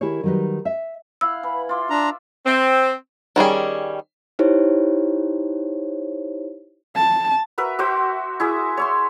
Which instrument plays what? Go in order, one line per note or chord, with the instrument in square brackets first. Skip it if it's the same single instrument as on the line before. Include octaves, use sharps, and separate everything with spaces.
[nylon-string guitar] D#3 E4 G4 G#4 A#4 C#5
D#3 F#3 G3 D#4 B4
E5
[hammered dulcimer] E4 F5 F#5 [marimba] E6
[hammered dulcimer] E3 [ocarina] B5
[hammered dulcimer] F4 D5 E5 [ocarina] C6
[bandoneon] D4 A#5
[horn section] C4
[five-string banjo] D#3 G3 C#4 G#4
[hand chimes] D#4 E4 G4 C5 C#5
[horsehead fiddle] A5
[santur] F#4 A#4 B4 E5
F#4 C5 E5 D6
E4 G#4 E5
C#5 E5 C6